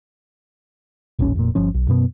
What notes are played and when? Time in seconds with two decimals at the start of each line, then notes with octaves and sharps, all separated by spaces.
1.19 D#1 A1 D#2 C#4
1.35 F1 A#2
1.55 G1 F3 C#4
1.74 B1
1.88 F#2 B2 B3